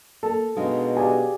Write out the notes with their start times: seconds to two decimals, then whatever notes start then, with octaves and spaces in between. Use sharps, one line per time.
0.23 A#3 A4
0.57 B2 G#3 D4 D#4 G#4 F5
0.97 G4 G#4 D5 F5 G#5